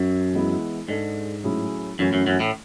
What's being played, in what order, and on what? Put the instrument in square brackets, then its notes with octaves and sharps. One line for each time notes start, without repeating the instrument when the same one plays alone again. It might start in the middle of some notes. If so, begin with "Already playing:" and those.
Already playing: [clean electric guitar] F#2
[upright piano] E3 G#3 B3 E4
[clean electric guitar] G#2 [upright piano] G#3 D4 A4
[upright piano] A2 F#3 C#4 E4 G#4
[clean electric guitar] F#2 [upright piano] E3 A3 C#4 E4
[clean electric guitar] F#2
F#2
A2